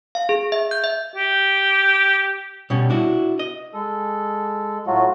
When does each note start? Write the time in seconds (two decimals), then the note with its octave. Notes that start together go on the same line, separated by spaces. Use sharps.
0.15 F5
0.29 G#4
0.52 E5
0.71 G6
0.84 E5
1.16 G4
2.70 B2 G3 C#4
2.90 D4 E4 F#4
3.39 D#5
3.74 G#3 A4
4.87 A2 F#3 A3 F4 F#4